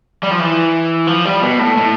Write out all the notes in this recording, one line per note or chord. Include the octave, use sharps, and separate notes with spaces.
G3
F3
E3
F3
G3
B2
A2
A2